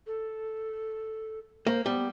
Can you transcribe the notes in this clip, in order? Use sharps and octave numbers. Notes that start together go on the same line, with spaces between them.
A4
A#3 C5
G3 B3